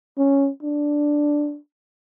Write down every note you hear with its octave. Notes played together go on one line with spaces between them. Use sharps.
C#4
D4